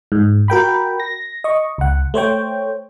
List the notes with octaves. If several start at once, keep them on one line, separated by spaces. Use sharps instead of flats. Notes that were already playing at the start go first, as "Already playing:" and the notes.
G#2
F#4 A#4 G5 B5
A#6
D#5 C#6
C#2 F#5
A3 C5 C#5 G5